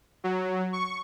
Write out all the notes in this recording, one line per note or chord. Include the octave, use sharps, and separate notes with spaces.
F#3
C#6